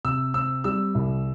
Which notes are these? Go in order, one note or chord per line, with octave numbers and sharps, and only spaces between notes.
C3 E6
C4 E6
G3 E6
C2